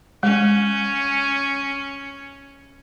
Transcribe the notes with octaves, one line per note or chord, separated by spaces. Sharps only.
G#3 C#4